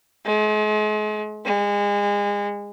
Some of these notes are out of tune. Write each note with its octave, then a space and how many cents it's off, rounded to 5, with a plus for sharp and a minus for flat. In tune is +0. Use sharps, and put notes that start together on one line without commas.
G#3 +40
G#3 -30